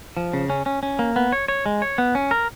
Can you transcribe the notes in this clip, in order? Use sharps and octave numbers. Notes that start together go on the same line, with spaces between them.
F3
C#3
C#4
C#4
C#4
A#3
B3
C#5
C#5
G#3
C#5
B3
C#4
A#4